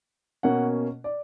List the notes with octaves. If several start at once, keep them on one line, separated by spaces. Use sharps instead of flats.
B2 A#3 C#4 F#5
D5